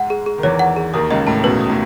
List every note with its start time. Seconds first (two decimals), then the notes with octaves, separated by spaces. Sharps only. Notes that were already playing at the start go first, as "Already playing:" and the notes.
Already playing: G#2 G#3 F#5
0.10 G#4
0.26 G#4
0.38 D#3
0.43 E2 E3 C#5
0.59 F#5
0.76 G#4
0.93 D#2 D#3 D#6
1.10 C#2 C#3 D#5
1.27 A2 A5
1.39 C#3
1.44 B2 B4
1.61 D#6
1.69 A2